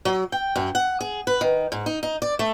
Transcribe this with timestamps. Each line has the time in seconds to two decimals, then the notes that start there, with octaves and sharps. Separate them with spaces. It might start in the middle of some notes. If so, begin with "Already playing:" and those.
0.05 F#3
0.32 G5
0.56 F#2
0.75 F#5
1.01 G#4
1.27 B4
1.41 D#3
1.72 G#2
1.86 D#4
2.03 D#4
2.22 D5
2.39 A3